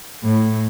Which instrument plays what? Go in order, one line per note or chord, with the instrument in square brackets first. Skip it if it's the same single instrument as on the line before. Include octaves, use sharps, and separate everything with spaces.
[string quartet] A2